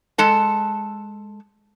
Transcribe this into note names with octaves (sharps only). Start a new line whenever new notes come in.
G#3 A4 A5